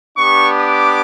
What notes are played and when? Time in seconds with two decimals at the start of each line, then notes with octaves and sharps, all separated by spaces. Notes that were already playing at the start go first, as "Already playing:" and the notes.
0.17 B3 D4 G4 C#6
0.60 D6